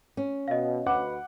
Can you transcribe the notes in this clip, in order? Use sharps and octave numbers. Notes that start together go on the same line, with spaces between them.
C#4
B2 D#5 F5
D2 F#4 B4 F#5 D6